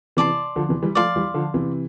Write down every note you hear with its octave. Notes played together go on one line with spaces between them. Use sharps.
C3 E3 D5 A5 C6
D3 F3
C3 E3
E3 G3
F3 A3 D5 F5 C6
E3 G3
D3 F3
C3 E3